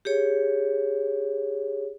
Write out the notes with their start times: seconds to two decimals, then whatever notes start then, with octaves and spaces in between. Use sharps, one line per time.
0.05 G4 G#4 C#5